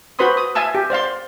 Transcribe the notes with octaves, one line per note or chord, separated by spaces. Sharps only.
F#4 B4 C5 B5 C6 D#6
D#6
E5 F5 G#5 A5 E6
G4
C5 D5 F5 C6